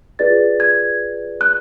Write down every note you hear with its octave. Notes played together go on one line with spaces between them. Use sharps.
F4 G#4 B4 D5 A6
G#6
F#6